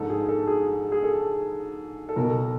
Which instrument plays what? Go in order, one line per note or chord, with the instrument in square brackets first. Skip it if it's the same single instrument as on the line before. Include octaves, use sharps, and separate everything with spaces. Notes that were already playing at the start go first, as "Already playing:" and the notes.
Already playing: [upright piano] A#1 G#2 F3 A4
G#4
A4
G#4
G#4
A4
A4
B1 B2 A#4
A4